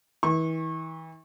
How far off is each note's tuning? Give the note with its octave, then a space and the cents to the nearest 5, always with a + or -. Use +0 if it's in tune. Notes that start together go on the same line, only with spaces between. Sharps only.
E3 -35 C#6 -25